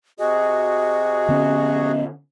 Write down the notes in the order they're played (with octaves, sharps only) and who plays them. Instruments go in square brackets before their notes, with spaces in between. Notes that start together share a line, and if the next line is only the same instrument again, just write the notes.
[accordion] C3 F#4 G#4 [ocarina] D#5
[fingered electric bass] D3 B3 C#4